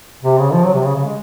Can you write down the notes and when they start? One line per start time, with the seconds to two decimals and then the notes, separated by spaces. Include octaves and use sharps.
0.23 C3
0.38 C#3
0.53 F3
0.63 F#3
0.74 C3
0.84 C#3
0.95 C#3
1.05 G#3